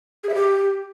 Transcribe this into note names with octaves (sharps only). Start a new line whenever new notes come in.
G#4
E5
G4